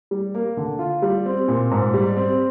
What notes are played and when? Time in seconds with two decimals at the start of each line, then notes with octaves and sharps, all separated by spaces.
0.11 G3
0.34 A#3
0.57 D3
0.79 F4
1.02 G3
1.26 C4
1.48 A#2
1.71 G#2
1.94 G3
2.17 C4